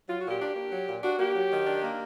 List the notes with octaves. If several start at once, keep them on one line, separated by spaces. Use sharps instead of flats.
F#3 F4
F#4
A#2 G4
D4
A#3
F#3
A#2
D4 F#4
A#3 G4
F#3
D#3
D4
A#3